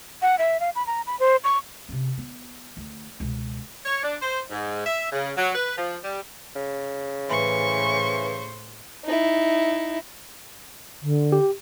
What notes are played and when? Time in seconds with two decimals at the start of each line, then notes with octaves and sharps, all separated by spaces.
0.22 F#5
0.38 E5
0.60 F5
0.75 B5
0.87 A#5
1.07 B5
1.19 C5
1.44 C#6
1.89 C3 C#4
2.18 B3
2.77 D2
3.20 C#2 B2
3.85 C#5
4.03 D4
4.22 C5
4.49 G#2
4.86 E5
5.12 C#3
5.37 F#3
5.55 B4
5.77 F3
6.04 G3
6.56 C#3
7.30 A2 E3 C5 C#6
9.04 D#4 E4
11.02 D3
11.32 G4